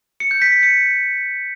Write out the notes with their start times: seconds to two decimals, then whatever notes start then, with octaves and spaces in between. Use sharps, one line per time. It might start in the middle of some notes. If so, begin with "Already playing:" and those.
0.20 C#7
0.31 G6
0.42 B6
0.52 B6
0.63 C#7